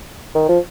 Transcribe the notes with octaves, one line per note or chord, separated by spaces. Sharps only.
D#3
F3